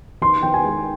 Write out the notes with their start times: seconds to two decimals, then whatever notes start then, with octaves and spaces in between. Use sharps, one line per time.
0.21 D#3 C6
0.43 D#3 G5
0.54 G#5
0.64 G#3